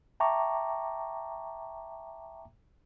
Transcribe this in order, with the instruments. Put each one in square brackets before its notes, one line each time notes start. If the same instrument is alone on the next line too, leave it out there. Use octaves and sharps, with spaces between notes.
[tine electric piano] E5 G5 A5 A#5 C#6 D6